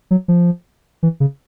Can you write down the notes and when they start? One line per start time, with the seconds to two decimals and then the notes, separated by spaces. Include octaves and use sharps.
0.11 F#3
0.28 F3
1.03 E3
1.20 C#3